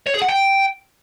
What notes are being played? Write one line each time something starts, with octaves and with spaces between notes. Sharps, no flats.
C#5
G#4
F#5
G5